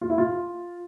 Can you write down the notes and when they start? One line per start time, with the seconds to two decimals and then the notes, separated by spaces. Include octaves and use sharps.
0.01 F4
0.10 E4
0.18 F4